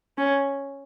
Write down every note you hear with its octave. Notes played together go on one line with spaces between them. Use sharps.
C#4